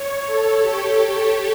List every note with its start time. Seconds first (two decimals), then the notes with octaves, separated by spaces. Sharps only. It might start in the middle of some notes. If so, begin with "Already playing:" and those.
Already playing: C#5
0.27 A4
0.61 G4
0.96 A4